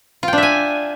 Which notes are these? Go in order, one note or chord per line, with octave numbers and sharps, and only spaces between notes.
D4 F4 E5 G5 G#5